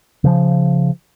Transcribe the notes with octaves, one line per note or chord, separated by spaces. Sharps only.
C#3 F3